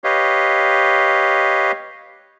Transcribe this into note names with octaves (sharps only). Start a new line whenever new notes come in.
G4 B4 C#5 D#5 F5